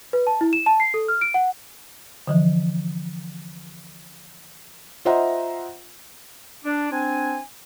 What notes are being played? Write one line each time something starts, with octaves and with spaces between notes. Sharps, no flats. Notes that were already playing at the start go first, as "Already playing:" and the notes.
B4
A5
E4
E7
A5
C7
A4
F6
D7
F#5
D3 E3 F3
F4 C5 D#5 E5 F#5 A#5
D4
C4 D4 G#5